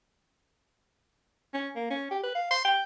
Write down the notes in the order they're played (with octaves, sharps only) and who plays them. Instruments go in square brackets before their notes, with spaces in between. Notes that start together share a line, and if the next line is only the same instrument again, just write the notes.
[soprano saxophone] C#4
A#3
C#4
G4
B4
F5
C6
G5